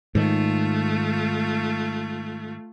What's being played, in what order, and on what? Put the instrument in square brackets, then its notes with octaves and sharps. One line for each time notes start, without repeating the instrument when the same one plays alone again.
[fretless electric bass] G#2 D#3 [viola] A3 F4